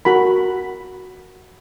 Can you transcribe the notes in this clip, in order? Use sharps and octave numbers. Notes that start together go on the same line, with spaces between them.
F#4 A#4 B5